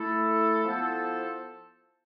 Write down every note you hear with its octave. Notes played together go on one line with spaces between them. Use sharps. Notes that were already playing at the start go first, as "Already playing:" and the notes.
Already playing: A3 E4 A4
F3 B3 E4 A4 C5